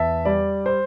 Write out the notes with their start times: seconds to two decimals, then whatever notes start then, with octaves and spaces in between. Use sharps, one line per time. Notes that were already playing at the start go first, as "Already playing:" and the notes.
Already playing: E2 E5 A5
0.25 G3 D5
0.66 C5